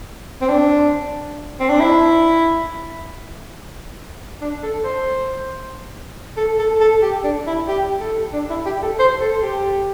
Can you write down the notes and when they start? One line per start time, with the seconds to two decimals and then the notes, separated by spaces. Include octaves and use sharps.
0.41 C4
0.49 D4
1.60 C4
1.69 D4
1.80 E4
4.41 D4
4.63 A4
4.84 C5
6.37 A4
6.59 A4
6.81 A4
7.02 G4
7.24 D4
7.47 E4
7.68 G4
8.00 A4
8.33 D4
8.50 E4
8.66 G4
8.83 A4
8.99 C5
9.21 A4
9.43 G4